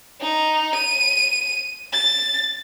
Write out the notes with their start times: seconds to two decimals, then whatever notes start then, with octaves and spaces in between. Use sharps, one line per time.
0.21 D#4
0.75 D#7
1.93 A6